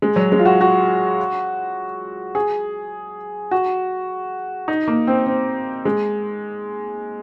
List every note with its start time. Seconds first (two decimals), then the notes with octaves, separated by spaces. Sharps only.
0.02 G#3
0.16 F#3
0.32 G#3
0.39 F4
0.45 F#4
0.61 F#4
2.35 G#4
3.51 F#4
4.68 D#4
4.87 A#3
5.07 C4
5.26 C4
5.85 G#3